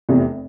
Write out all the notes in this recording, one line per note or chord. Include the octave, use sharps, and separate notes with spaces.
F1 E2 C3